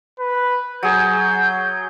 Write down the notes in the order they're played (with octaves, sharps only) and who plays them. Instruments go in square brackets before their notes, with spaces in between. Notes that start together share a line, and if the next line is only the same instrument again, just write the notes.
[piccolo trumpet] B4
[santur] F#3 G#4 [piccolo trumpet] G6